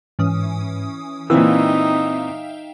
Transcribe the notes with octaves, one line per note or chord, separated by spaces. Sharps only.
G#2 E3 C#4 D#6
A#2 E3 C4 D#4 E5 F5 G5 E6